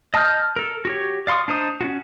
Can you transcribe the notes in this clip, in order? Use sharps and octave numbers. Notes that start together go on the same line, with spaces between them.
D#5 A5 D#6 F6 G6
A4 A#4
F#4 G4 C#5
D5 F5 C6 C#6 D#6
D4 D#4 C5 D#6
C#4 F4 F#4